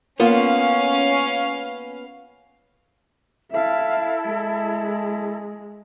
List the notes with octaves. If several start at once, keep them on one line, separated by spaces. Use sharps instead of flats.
A#3 B3 C#4 F4 F5
E4 A4 E5 F5
G#3